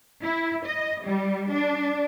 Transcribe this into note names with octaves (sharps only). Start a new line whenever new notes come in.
E4
D#5
G3
D4